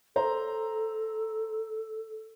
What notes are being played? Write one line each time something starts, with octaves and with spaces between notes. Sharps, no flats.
A4 C5 A#5